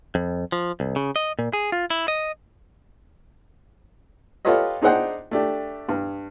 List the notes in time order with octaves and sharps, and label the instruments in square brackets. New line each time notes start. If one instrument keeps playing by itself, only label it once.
[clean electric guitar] F2
F3
C2
C#3
D#5
A#2
G#4
F4
E4
D#5
[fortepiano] F4 G4 A4 B4 C#5 D#5
D4 D#4 G#4 C5 F#5 G5
A3 D4 G4
G2